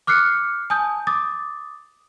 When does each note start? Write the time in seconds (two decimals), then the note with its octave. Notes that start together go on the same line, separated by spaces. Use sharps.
0.07 D6 F6 F#6 C7 C#7
0.70 G#5 A5 D#6 G6
1.07 D6 D#6 A6